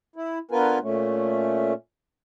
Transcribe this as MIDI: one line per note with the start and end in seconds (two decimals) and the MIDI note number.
0.16 0.39 64
0.51 0.79 50
0.51 0.79 59
0.51 0.79 65
0.51 0.79 70
0.51 0.79 71
0.51 0.79 80
0.82 1.73 46
0.82 1.73 57
0.82 1.73 61